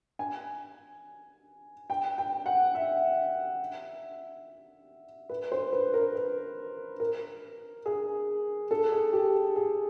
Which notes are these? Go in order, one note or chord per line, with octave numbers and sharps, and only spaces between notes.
G#5
G5
G5
F#5
E5
B4
C5
B4
A#4
B4
A#4
G#4
A4
G#4
G4
G#4